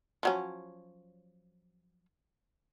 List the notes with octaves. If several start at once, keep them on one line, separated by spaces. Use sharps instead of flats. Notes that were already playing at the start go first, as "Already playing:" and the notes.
F3 F#3 C#4